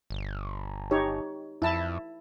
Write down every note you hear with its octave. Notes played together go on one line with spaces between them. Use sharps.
G1
D#4 G4 C#5
F2 E4 A5